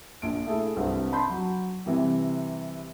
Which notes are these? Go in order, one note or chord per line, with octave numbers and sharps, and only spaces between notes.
A#1 D7
A3 E4 G#4 A4
C2 G2 C4
A5 B5 C6 G6
F#3
C3 E3 G3